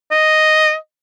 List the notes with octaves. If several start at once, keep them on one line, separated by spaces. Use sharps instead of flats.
D#5